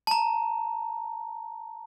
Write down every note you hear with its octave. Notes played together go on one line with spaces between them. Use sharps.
A5 A#5